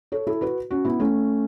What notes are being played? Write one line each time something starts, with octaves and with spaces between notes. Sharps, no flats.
A4 C#5
E4 A4
F#4 B4
C#4 F#4
B3 E4
A3 C#4